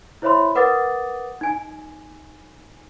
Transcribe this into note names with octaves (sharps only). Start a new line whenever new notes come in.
E4 C5 C#5 E5 B5 C6
A#4 B4 F#5 D6 D#6 A6
D#4 G#5